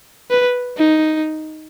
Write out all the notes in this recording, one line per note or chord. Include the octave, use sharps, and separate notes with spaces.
B4
D#4